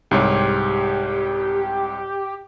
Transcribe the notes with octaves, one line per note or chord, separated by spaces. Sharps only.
C2 G#2 G4 C#5